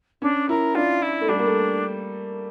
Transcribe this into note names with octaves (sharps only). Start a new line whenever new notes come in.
C#4 D4
E4 A#4
D4 F4
E4
A3
G3 D4
A#3
A3